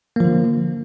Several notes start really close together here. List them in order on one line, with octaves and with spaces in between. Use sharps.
A#3 F3 D3